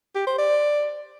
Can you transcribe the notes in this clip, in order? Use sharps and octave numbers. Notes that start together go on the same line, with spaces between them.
G4
C5
D5